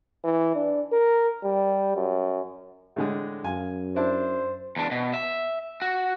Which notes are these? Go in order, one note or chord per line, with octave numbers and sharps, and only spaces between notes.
E3
D4
A#4
G3
F#2
A2 D3 G#3
F#2 F5 G#5
D4 E4 C5 A5
E2 D4
B2
E5
F#4